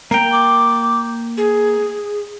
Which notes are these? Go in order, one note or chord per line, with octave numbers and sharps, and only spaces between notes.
A#3 G5 A#5
D6
G#4